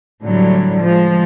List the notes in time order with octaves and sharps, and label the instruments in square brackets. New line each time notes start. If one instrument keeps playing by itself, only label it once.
[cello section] A2 D3 F#3 G3
F3 G#3